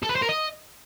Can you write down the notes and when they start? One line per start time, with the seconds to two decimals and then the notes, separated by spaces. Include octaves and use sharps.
0.03 A4
0.09 B4
0.16 C5
0.22 A#4
0.29 D#5